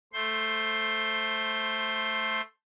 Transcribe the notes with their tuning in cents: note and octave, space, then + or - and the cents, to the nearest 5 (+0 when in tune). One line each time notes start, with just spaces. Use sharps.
A3 +0 C5 +0 C6 +10